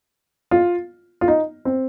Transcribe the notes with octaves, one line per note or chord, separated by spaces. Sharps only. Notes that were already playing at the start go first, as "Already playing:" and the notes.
F4
F4
D#4
C4